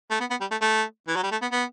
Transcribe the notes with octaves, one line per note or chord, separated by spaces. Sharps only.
A3
B3
B3
G3
A3
A3
E3
F#3
G3
A3
B3
B3